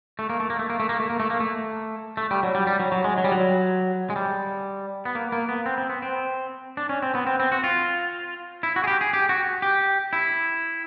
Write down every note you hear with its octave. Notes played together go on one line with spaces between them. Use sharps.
A3
A#3
A3
A#3
A3
A#3
A3
A#3
A3
A#3
A3
A#3
A3
A3
G3
F#3
G3
G3
F#3
F#3
G#3
F#3
G3
F#3
G#3
G3
B3
A#3
A#3
B3
C4
C4
B3
C4
D4
C#4
C4
B3
C4
C4
F#4
F4
E4
F#4
G#4
G4
G#4
G4
F#4
G4
E4